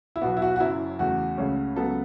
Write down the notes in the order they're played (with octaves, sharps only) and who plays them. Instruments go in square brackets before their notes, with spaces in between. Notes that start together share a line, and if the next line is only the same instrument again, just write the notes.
[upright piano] E4
B1 B2 B3 F#4
E4
F#4
F#4
F#1 F#2 F#3 E4
E2 C#3 A3 F#4
C#2 C#3 A3 C#4
C#2 C#3 F#3 B3 A4